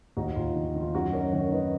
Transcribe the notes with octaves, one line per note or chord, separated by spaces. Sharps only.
D#2 D#4 F#4
D#2 F4
D#3
D#3
F4
F#2 D#4 F#4
F#2 A#4 C#5
D#3 A#4 C#5
D#3 B4 D#5